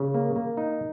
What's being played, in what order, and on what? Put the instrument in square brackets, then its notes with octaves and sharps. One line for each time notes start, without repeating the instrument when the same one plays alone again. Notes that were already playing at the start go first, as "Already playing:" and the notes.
Already playing: [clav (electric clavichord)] C#3
A#3
A#3
D#4